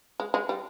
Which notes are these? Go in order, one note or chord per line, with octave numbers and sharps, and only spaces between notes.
G#3
G#3
G3